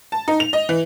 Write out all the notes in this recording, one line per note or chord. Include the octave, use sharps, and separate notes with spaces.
A5
D#4
F7
D#5
E3